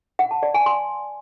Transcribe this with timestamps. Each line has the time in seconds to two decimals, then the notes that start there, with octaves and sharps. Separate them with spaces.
0.19 F#5
0.31 A5
0.43 D5
0.54 G#5
0.66 C6